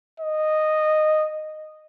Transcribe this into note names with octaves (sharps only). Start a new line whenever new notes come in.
D#5